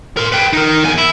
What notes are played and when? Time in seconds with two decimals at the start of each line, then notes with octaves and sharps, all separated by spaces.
0.17 A#4 C6
0.32 B4 G5
0.53 D#4 A#4
0.83 E2 G#5
0.98 E4